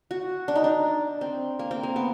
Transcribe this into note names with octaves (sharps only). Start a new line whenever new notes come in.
F#4
D4
D#4
D4
C4
A#3
C4
A#3
B3